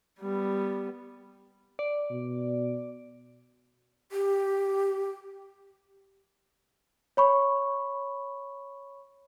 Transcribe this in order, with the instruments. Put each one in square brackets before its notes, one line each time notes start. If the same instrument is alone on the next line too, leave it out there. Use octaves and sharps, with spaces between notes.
[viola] G3 B3
[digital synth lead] D5
[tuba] B2
[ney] G4
[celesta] C#5 B5 C#6